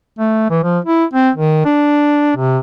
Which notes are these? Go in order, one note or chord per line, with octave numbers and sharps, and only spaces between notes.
A3
E3
F3
E4
C4
D#3
D4
C3